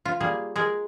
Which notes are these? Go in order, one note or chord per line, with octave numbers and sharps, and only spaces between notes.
F4
G3 A#3 G#4
G#3 G#4 A#4